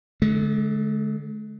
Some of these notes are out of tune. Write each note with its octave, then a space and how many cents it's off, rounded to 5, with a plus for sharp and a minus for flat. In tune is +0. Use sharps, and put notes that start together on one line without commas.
D3 +0 G#3 +45